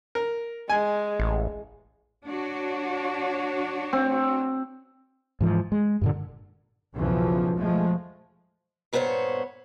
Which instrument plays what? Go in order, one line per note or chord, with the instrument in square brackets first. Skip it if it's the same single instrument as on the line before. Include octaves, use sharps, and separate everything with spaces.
[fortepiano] A#4
[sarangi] G#3 [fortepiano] G#5
[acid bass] A1
[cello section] D4 F#4 C#5
[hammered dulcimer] C4
[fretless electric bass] G#2 E3 F3
G#3
G2 A#2 D3
[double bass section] B1 E2 C#3 E3 F3
F3 G#3 A3
[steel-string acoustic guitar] G2 A#2 B3 C5 C#5